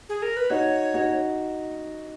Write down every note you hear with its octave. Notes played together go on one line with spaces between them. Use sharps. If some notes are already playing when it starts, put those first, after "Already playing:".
G#4
A#4
B4
D#4 F#4 C#5
D#4 F#4